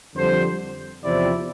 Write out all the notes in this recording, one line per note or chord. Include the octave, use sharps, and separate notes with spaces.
F2 D3 G3 D4 C5
E2 C3 F3 C4 E4 D5